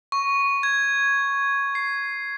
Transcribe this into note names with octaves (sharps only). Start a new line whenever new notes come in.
C#6
G#6
C7